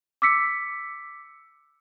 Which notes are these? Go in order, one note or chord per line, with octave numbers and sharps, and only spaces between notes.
D6 E6 B6 C#7